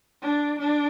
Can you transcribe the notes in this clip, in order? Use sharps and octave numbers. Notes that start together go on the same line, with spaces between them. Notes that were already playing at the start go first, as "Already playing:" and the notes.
D4
D4